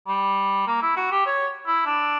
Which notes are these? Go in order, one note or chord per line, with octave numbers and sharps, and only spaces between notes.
G3
A#3
E4
F#4
G4
C#5
E4
D4